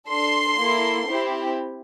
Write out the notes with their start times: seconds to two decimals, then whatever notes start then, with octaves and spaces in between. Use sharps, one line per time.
0.10 D4 A4 C6
0.60 A#3 E4 A4
1.10 C4 E4 G4